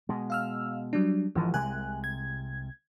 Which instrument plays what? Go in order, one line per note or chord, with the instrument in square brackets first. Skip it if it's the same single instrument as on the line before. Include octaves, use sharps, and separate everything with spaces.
[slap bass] B2 G#3
[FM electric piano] F5 E6 F6
F#3 G3 D4
[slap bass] G#1 G#2 D3 [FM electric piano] E3 F3
[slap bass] C2 C3 G#3 [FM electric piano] G#5 F#6
[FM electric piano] G#6